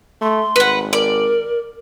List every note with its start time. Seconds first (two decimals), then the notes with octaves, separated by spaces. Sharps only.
0.22 A3 C6
0.56 G#1 B4 F#5
0.93 A#4 D5